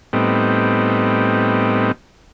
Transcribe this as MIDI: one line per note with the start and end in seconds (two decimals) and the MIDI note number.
0.13 1.92 45
0.13 1.92 55
0.13 1.92 59
0.13 1.92 60
0.13 1.92 63